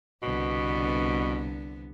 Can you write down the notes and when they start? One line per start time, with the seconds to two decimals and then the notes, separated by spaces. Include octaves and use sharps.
0.23 C2 B2 D3 B3